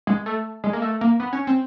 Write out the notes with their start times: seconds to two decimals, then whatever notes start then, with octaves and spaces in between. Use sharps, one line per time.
0.07 G#3
0.26 A3
0.64 G#3
0.73 A#3
0.82 A3
1.01 A#3
1.20 B3
1.33 C#4
1.47 C4